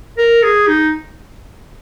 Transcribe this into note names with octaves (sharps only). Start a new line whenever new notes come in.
A#4
G#4
D#4